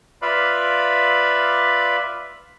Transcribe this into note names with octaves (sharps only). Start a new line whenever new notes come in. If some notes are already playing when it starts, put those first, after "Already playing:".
F4 B4 D5 E5 F5 B5